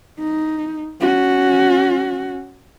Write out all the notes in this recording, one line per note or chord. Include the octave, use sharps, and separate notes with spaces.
D#4
C#4 F#4